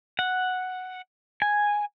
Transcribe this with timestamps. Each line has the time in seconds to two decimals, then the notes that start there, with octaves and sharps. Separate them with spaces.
0.19 F#5
1.42 G#5